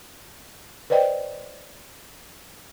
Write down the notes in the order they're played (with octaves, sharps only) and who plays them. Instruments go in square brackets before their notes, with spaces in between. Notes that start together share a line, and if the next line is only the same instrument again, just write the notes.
[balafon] B4 C5 D5 D#5 G5